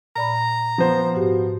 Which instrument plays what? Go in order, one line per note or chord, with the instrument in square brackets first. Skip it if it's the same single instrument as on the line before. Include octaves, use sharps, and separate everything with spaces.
[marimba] A#2 D5 B5 [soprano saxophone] A#5
[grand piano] F3 B3 C5
[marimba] G#2 F#4 G4